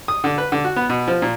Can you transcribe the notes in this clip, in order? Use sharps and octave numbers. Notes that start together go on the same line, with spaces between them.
D#6
D3
B4
D3
F#4
B3
B2
F3
A#2